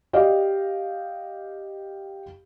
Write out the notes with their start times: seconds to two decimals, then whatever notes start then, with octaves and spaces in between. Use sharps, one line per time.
0.13 G4 D5 D#5 F5